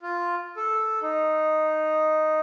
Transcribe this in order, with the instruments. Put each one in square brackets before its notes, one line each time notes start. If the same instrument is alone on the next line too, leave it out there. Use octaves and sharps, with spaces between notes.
[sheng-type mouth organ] F4
A4
D#4